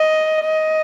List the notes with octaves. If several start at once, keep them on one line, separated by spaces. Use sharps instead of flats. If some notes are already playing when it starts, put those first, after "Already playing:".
Already playing: D#5
D#5